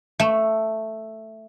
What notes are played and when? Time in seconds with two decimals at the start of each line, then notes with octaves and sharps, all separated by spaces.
0.20 A3